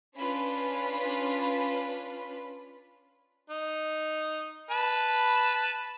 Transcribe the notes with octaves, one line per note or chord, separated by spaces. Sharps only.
C#4 D4 F4 B4 B5
D#4
B4 A5 B5